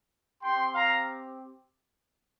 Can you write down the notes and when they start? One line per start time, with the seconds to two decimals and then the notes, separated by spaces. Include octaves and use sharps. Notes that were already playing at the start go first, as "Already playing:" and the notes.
0.43 C4 G4 G5 C6
0.74 F5 A#5